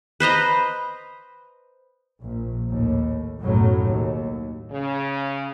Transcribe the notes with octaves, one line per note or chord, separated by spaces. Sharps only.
B4 C5 D#5 A#5
A#1
D#2 A2
B1 F#2 A2 F#3
D#2
C#3